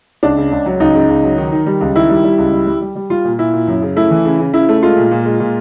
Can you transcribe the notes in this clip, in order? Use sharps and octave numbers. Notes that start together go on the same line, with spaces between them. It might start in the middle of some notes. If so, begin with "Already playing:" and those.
C#2 D4
C#3
C#2
F#3
C#2 D#4
C#3
C#2
F#3
D#3
D#3
G3
C#2
D#3 E4
G3
G3
C#2
G3
G3
G3
G3
G3 F4
A#2
A#2 E4
A#2
F#2
C#3
A3 E4
E3
C#3
C#3
C#3 E4
A3
G#3 F4
A#2
A#2
G#3
A#2